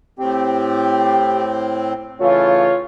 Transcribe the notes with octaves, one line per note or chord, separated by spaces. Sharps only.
A2 C4 G4
C#3 E3 A3 F4 C#5